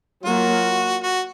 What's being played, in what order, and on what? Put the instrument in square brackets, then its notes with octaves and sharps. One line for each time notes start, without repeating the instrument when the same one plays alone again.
[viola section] F#3 A#3 F4 [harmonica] F#4
[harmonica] F#4